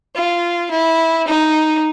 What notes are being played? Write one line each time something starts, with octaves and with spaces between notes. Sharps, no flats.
F4
E4
D#4